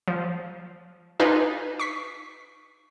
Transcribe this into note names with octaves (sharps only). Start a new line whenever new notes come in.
F3
D4 D#4 F4 G#4 B4
C#6 B6